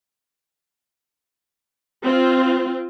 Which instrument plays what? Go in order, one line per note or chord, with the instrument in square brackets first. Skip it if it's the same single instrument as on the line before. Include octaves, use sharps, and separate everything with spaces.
[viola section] C4 F4